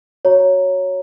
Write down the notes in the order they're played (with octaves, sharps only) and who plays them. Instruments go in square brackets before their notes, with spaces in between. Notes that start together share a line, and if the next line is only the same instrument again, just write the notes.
[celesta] F#4 C#5 A#5